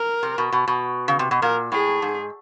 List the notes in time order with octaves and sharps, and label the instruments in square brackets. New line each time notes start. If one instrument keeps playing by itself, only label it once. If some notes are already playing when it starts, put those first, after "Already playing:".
Already playing: [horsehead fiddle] A#4
[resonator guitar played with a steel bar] C3
B2
B2
B2
C#3
C3
B2
[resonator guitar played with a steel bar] A#2 [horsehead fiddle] A#4
[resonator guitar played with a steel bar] A2 [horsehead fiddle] G#4
[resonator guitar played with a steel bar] G#2